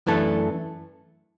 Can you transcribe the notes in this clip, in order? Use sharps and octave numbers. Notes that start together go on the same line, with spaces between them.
F#2 E3 A3 D4 A4